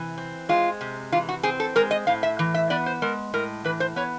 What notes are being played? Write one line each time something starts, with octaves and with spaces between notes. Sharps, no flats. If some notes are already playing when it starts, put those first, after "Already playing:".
Already playing: C3 E3
C4
G#3 F4
C3
E3 F4
F#4
C4 G#4
A4
G#3 A#4
D#5
A2 F5
E5
E3
E5
B3 D5
C5
G#3 A#4
A2 A#4
E3 B4
C5
B3 C#5